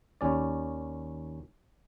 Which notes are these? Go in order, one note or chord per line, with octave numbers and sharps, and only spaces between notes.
D#2 C#4 D5